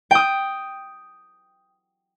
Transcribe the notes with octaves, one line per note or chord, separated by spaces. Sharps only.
G5 D#6